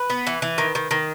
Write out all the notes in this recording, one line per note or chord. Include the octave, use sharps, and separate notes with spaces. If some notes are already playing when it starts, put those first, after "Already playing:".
Already playing: B4
B3
E3
E3
D#3
D#3
D#3